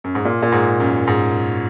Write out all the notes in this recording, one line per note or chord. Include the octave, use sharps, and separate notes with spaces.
F#2
G#2
A#2
A#2
G#2
F#2
G#2